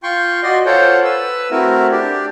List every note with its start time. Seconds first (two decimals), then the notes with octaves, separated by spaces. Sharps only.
0.03 F4 G5 C6 C#6
0.43 F#4 D5 D#5 C6
0.66 F4 A4 C5 C#5 F#5 G5
1.04 B4 E6
1.51 A3 C4 E4 F#4 A#4
1.91 D4 G4